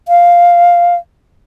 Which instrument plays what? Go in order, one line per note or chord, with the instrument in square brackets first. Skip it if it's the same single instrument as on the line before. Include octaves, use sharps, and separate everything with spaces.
[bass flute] F5